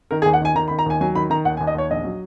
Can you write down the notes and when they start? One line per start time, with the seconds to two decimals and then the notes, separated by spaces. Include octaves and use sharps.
0.11 D#3 A#4
0.22 G#4
0.26 D#2
0.33 F#5
0.41 D#3 G#5
0.55 D#3 A#5
0.68 B5
0.71 D#3
0.79 A#5
0.86 D#2 G#5
1.01 F#3 G#5
1.15 D#3 B5
1.30 D#3 A#5
1.45 D#2 F#5
1.57 G#5
1.61 D#2
1.67 D#5
1.75 D#2 C#5
1.90 A#1 D#5
2.04 F#3